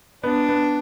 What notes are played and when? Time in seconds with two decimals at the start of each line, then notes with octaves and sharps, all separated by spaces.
0.24 B3 D4
0.49 B3